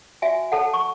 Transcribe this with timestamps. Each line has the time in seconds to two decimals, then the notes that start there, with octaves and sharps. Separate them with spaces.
0.22 F#4 E5 G#5
0.52 A4 C#5 F#5 A5
0.74 C#6